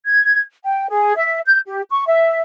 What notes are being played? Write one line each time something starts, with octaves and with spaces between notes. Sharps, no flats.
G#6
G5
G#4
E5
G6
G4
C#6
E5